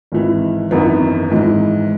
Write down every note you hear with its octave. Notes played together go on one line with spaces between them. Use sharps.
G#1 G#2 E3
G#1 F#2 E3 B3 D#4
G#1 G#2 E3